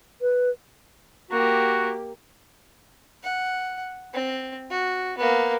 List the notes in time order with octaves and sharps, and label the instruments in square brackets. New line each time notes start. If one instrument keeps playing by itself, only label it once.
[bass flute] B4
[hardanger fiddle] A#3 G4 [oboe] F#4
[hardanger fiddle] F#5
C4
F#4
A#3 B3